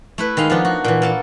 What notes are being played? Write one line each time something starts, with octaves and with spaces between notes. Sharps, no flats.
A3 E4 B4
D#3 G#3 F5 C6
F3 B3 D4 D#4
F#4
A#2 E3
A#3 A4 A5